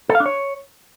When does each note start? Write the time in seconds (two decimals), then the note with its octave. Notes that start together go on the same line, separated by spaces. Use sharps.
0.09 A4
0.15 F5
0.20 D4
0.26 C#5